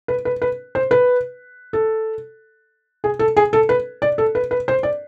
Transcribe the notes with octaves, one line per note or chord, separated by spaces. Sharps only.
B4
B4
B4
C5
B4
A4
G#4
A4
G#4
A4
B4
D5
A4
B4
B4
C5
D5